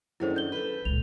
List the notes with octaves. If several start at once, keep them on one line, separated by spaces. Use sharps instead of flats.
F#2 D3 D#3 E4 G#4 C5
G6 G7
A4 B4
C#2 A#2 F7